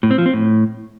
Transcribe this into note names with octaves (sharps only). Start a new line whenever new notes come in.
A2
C4
F3
C4
A2